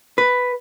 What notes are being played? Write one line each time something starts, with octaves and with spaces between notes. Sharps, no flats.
B4